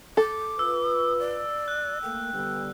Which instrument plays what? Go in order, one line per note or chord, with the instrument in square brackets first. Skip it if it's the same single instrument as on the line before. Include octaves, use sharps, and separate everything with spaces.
[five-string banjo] A4 [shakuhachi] D6
[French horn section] F4 B4 [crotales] E6
[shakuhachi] D5
[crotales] F#6
[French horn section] A3 A#3 [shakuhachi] G5
[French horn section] D3 G3 B3